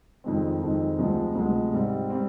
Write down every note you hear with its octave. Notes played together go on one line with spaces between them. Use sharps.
F2 D#3 G#3 C4
F2 D#3 G#3 C4
D2 C3 F3 G#3
D2 C3 F3 G#3
G#2 G3 C4
G3 C4